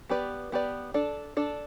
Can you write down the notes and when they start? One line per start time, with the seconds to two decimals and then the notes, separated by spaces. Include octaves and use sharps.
0.09 B3 G4 B4 D5
0.52 B3 G4 B4 D5
0.94 D4 A4 D5
1.37 D4 A4 D5